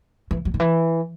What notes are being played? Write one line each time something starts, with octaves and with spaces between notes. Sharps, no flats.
E3
F#3
D#3
E3